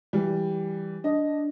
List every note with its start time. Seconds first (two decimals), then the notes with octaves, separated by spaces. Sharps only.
0.13 E3 G3
1.04 D4 D#5